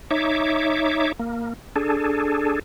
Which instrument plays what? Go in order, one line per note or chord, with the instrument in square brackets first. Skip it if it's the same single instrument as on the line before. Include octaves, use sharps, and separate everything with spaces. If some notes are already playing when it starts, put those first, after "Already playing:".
[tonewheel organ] D#4 C#5 E5 D6
A#3
D4 G#4 A4